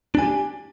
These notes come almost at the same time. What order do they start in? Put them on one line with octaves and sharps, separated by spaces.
D4 G#5 G4